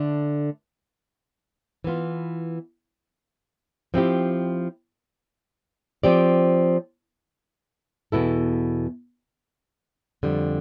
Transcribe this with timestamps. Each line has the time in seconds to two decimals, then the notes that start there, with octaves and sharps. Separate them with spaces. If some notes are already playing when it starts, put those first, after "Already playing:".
Already playing: D3 A3 D4
1.84 E3 B3 F4
3.94 F3 C4 E4 G4
6.03 F3 C4 G4 D5
8.12 E2 B2 B3 E4 A4
10.23 F2 D3 G3